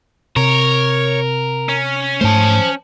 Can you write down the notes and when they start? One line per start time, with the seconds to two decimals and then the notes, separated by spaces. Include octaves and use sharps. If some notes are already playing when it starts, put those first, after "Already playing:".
0.36 C3 A#4 C#5
1.69 C#4
2.21 G#2 A3 C5 A5